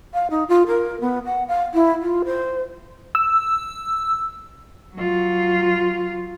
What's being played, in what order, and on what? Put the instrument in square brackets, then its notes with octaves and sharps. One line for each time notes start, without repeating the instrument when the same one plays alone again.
[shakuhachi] F5
D#4
F4
A#4
B3
F#5
F5
E4
F4
C5
[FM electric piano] E6
[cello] F#3 F4